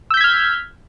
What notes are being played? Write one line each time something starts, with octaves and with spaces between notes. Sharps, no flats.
E6 F6 G6 G#6 B6